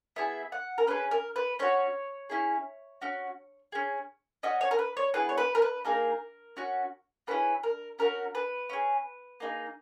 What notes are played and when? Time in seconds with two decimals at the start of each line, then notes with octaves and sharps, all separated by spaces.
0.16 B3 E4 G#4 E5
0.52 F#5
0.78 A#4
0.87 C#4 G#4 B4
1.11 A#4
1.36 B4
1.59 C#4 F#4 C#5
2.30 C#4 E4 G#4
3.01 C#4 F#4
3.72 C#4 G#4
4.43 C#4 F#4 D#5
4.61 C#5
4.71 A#4
4.79 B4
4.97 C#5
5.14 B3 E4 G#4 B4
5.29 C#5
5.38 B4
5.55 A#4
5.62 B4
5.85 A#3 D#4 G#4 A#4
6.57 C#4 F#4
7.27 A#3 C#4 E4 G#4 B4
7.63 A#4
7.99 C#4 F#4 A#4
8.35 B4
8.69 C#4 G#4
9.40 A#3 D#4 G#4